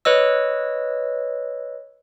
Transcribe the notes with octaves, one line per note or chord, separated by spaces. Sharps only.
B4 C#5 D#5 E6